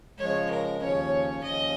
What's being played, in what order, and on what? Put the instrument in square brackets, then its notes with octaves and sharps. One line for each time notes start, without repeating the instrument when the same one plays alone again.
[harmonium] C#3 F3 G#3 [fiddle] C#5
[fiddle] A#4
[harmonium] D#2 C#3 F3 C#4 [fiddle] C#5
[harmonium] D#2 C#3 F3 C#4 [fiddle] D#5